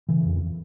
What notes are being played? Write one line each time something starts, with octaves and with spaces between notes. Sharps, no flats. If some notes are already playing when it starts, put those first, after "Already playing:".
C#3 E3
F2